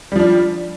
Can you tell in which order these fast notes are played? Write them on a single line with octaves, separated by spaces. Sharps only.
G3 F3 D4